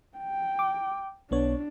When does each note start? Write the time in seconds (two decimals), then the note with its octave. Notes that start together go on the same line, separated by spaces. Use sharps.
0.18 G5
0.59 D6
1.31 B1 B3 D4 C#5